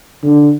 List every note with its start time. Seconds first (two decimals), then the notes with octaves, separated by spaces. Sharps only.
0.23 D3